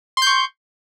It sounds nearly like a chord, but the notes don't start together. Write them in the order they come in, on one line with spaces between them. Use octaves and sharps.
C6 G6 C#6